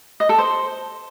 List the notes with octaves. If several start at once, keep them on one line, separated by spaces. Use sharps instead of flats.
D#5
A4
C5